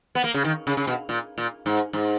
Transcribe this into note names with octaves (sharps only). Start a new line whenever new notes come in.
B3
A#3
C#3
D#3
C#3
C#3
B2
A#2
A#2
G#2
G#2